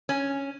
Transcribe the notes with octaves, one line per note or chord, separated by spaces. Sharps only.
C#4